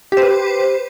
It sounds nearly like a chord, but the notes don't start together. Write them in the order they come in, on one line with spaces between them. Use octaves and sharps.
G4 C5 B4